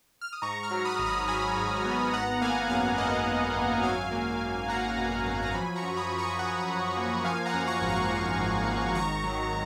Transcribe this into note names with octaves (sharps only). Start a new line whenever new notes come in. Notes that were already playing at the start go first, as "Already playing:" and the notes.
F6
D#6
G#2 A#5 C#6
C#6 F6
F#3
B5 D#6
G#1
B5 D#6
F#3 G#5 B5
G#2
B3
G#1 F#5 A#5
A#3 F5 G#5
F#2 F5 G#5
A#3 D#5 F#5
F#2
G#1
F#3 F5 G#5
A#3
F#3
A#3 F#5 A#5
B2
F#3
A#5
F3 G#5 B5
A#5 C#6
F#2
B5 D#6
F3
A#5 C#6
F3 F#5 A#5
F#2
A#3
F3 F5 G#5
F#5 A#5
F#2
A#5 C#6
G#1
A#5 C#6
F3
G#1
G#1
D#3 A#5 C#6
F#3